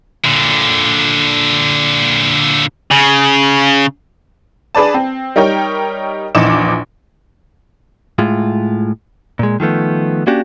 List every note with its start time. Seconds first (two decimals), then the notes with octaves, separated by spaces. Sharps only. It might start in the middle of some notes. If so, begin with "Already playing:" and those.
0.25 A#2 D3
2.91 C#3
4.75 D4 G#4 B4 D5 A5
4.94 C4
5.36 G3 D#4 A#4 C#5 G5
6.35 A#1 E2 D#4 D6 E7
8.19 A2 G#3 F4
9.39 A#2 G#3
9.60 D#3 F3 A3 B3
10.27 A#3 C#4 D4 F#4 G4